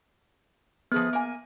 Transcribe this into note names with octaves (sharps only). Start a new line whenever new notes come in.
F3 B3 G#4 B4
A#3 G#5